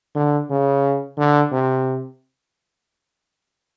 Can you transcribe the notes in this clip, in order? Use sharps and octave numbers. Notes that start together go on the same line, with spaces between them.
D3
C#3
D3
C3